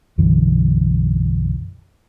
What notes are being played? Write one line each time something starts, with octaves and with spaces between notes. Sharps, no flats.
B1 F#2 D3 E3